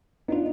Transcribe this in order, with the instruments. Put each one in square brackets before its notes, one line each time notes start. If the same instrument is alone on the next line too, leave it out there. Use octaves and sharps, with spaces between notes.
[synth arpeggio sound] B3 D4 F4 [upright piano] D#4